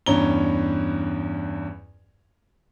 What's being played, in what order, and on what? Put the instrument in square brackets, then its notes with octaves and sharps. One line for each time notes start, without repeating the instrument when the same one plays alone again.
[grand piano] E2 G2 C#4 A#5 G7